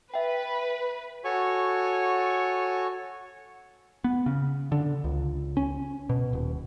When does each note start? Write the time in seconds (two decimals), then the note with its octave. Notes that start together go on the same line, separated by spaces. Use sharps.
0.14 B4 E5 G5
1.24 F#4 A4 C#5 G#5 C#6
4.04 B3
4.26 C#3
4.72 D3
5.04 C#2
5.57 C#4
6.09 B2
6.33 D#1